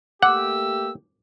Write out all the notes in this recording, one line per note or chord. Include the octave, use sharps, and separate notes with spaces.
A3 A#3 G4 F#5 D6 E6